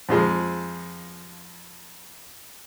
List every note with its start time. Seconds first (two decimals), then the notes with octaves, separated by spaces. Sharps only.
0.09 F2 F3 G#3